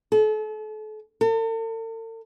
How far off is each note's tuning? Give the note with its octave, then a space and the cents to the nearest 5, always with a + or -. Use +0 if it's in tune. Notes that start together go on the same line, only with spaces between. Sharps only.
A4 -40
A4 +45